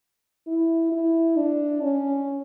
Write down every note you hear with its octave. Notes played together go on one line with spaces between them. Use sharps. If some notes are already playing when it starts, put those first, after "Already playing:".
E4
E4
D4
C#4